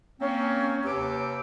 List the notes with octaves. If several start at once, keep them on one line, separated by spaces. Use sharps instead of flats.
A#3 C4 C#4
D#2 C3 G4 B4 D6 E6